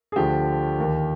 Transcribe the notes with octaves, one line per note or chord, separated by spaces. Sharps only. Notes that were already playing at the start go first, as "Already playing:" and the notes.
G#4
D2 D3 F3 G4
D#2 D#3